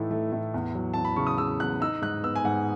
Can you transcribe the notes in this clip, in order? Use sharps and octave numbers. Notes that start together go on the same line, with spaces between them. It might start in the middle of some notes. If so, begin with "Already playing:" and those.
Already playing: A2 E3 A3 D#4
A3
A2
E2
F#3
E2 A5
B5
C#3 C#6
D#6
C#3 E6
E2 F#6
D#4 E6
G#2 F#6
B3 E6
G#5
G#2 F#5